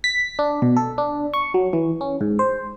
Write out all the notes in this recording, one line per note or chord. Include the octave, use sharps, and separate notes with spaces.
B6
D4
B2
A4
D4
C#6
F#3
E3
C#4
G#2
C5